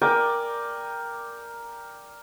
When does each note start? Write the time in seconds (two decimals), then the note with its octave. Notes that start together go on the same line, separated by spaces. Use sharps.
0.02 A#4 D5 G5 G#5